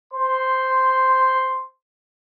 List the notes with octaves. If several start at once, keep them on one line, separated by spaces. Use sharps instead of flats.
C5 C6